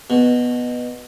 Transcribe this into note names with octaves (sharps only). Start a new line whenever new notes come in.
B2